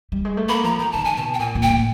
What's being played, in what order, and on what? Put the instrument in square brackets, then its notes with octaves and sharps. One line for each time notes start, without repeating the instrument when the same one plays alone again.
[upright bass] G3
G#3
A3
[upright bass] A#3 [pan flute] B5
[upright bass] F3 [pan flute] A#5
[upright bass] D#3 [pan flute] A#5
[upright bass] D#3 [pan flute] A5
[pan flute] G#5
[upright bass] B2 [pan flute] A5
[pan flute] G5
[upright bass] A#2 [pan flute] G#5
[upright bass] A#2
[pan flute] G5
[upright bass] A2